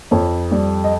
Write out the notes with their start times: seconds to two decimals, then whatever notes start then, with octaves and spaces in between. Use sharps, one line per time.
0.11 F2 C#5
0.51 G3 D5
0.84 D#5